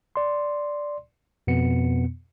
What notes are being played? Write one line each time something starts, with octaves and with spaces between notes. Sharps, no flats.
D5 C6
F2 B2 B3 C#7